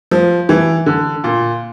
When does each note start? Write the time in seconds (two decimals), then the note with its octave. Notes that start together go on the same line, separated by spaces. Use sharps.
0.11 F3
0.49 E3
0.86 D3
1.24 A#2